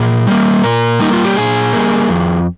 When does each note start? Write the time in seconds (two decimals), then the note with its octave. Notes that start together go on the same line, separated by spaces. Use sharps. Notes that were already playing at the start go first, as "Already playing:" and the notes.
Already playing: A#2 G#4
0.27 G3 A#3
0.64 A#2 A#4
0.99 G3 A#3 D#4
1.13 F4
1.25 G4
1.36 A#2 G#4
1.73 G3 A#3
2.09 F2